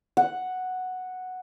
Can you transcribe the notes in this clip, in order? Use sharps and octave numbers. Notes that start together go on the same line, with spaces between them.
F#5